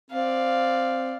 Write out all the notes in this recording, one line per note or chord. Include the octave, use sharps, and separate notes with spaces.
C4 D5 F5